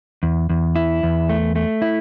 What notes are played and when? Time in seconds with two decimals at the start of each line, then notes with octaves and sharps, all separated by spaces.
0.23 E2
0.50 E2
0.76 E4
1.03 E2
1.29 A3
1.56 A3
1.82 E4